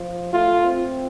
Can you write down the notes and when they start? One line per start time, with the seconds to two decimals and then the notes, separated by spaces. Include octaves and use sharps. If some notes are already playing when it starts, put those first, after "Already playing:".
Already playing: F3
0.33 A3 F4
0.65 C4